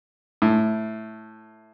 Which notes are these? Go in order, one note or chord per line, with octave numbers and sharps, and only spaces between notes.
A2